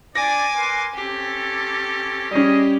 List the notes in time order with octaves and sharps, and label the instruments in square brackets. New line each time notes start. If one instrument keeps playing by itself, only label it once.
[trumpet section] D4 D5 [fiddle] G#5 D6 [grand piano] A#6
[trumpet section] A#4 B4 C6
[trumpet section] C4 C#4 A4 [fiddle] G4
[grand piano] G3 C#4 [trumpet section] G#4 D#5